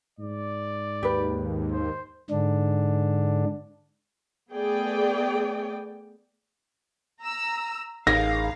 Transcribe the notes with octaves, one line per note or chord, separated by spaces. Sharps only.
G#2 D5
D#2 G4 B4
C5
G#2 D3 D4
A3 B3 G#4 D5 G5
A#5 E6
A1 D#4 G#4 A#4 F5 A#6